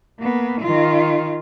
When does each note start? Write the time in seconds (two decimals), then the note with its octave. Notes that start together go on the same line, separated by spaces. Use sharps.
0.20 A#3 B3
0.61 D#3 F4